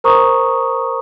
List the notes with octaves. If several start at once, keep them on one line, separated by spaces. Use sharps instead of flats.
A#4 C5 A#5 C#6 D#6